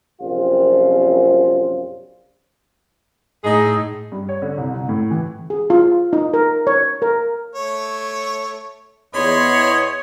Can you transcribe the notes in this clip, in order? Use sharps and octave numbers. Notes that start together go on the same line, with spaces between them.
A#1 F#2 C3 G3 C4 F4
A2 D#4 G#4
G2
C#5
D3
C2
C2
A2
E3
G#4
F4
D#4
A#4
C#5
A#4
A3 C#5
E2 C#5 D#5 B5 C6